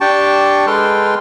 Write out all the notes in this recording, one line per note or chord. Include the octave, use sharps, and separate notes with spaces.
D4 G4 G5 A5 C#6
G#3 A4 B4 G5 C6 F6